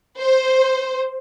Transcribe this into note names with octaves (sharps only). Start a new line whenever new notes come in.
C5